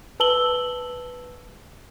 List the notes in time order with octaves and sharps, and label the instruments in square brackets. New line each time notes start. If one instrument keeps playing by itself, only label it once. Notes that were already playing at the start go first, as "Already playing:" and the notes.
[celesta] B4 A5 E6 F#7 G7